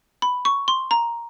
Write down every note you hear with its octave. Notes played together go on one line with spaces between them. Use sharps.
B5
C#6
C6
A#5